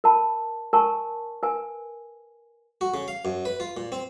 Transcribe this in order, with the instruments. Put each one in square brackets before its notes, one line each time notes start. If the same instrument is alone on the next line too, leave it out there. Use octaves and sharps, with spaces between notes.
[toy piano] A#4 A5 B5
A#4 G#5 A5 C#6
A#4 B4 G#5
[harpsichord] F#4
C#3
F5
F#2
B4
F4
A#2
C4